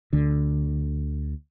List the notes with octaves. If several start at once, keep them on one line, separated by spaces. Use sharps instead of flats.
D2 D3